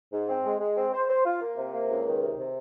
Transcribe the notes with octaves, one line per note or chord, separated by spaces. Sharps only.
G#2
C4
G#3
G#3
C4
C5
C5
F4
A#3
C3
A#3
C#2
D#3
C3
C3